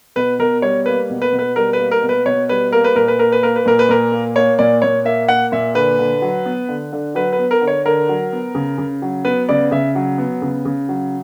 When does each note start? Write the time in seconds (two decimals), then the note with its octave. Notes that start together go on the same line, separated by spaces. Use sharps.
0.16 B2 B4
0.39 B2 A#4
0.62 G3 C#5
0.86 A#3 B4
1.10 B2
1.22 B4
1.32 B2
1.39 B4
1.56 G3 A#4
1.73 B4
1.79 A#3
1.91 A#4
2.02 B2
2.09 B4
2.26 B2 C#5
2.49 G3 B4
2.72 A#3 A#4
2.84 B4
2.95 A#2 A#4
3.08 B4
3.19 A#3 A#4
3.32 B4
3.42 A#3 A#4
3.56 B4
3.65 A#2 A#4
3.79 B4
3.89 A#2 A#4
4.12 A#3
4.35 A#3 C#5
4.59 A#2 D5
4.82 A#2 C#5
5.05 A#3 E5
5.28 A#3 F#5
5.52 A#2 E5
5.75 D3 B4
5.99 D3
6.22 F#3
6.46 B3
6.69 D3
6.93 D3
7.15 F#3 B4
7.33 B4
7.39 B3
7.51 A#4
7.62 D3
7.67 C#5
7.85 D3 A#4
8.09 F#3
8.33 B3
8.55 C#3
8.78 C#3
9.02 F#3
9.25 B3 B4
9.49 C#3 D5
9.71 C#3 E5
9.95 F#3
10.18 B3
10.42 C#3
10.65 C#3
10.89 F#3